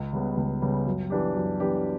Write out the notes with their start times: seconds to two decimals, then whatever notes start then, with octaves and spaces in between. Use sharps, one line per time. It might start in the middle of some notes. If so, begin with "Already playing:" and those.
Already playing: C#2
0.13 C#3 G3 B3
0.37 C#2
0.62 C#3 G3 B3
0.86 F#2
1.10 E3 B3 D4 G4
1.35 F#2
1.60 E3 B3 D4 G4